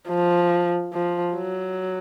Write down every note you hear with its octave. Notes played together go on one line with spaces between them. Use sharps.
F3
F3
F#3